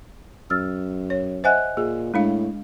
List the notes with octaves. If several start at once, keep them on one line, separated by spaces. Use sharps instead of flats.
F#2 E6 F6 A6
C#5
C5 D#5 E5 F#5 G#5 F#6
A#2 G#4
A2 G#3 D4 F5